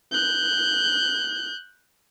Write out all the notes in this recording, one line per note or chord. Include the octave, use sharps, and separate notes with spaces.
F#6 G6